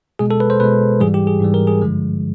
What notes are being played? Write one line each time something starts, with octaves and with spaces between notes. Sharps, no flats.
B2 G#3 G#4
A4
B4
C5
B2 G#3 B4
G#2 E3 G3 G#4
G4
G#4
G#2 E3 G3
A#4
G#4
G2 D3 F3 G#3